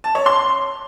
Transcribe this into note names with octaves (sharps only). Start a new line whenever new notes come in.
A5
C#5
C6